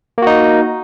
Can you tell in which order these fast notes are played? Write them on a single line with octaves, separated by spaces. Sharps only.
A#3 F#4 D#4